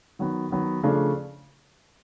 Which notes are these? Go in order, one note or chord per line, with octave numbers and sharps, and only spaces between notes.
D#3 F#3 B3
D#3 F#3 B3
C#3 F3 A3 D4